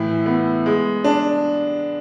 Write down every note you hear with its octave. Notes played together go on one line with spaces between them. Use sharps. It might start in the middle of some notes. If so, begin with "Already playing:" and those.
Already playing: A2 E3 E4
B3
G#3
D4